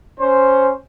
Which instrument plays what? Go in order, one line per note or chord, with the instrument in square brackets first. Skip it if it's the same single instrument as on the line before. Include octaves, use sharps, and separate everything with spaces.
[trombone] C#4 [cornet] C5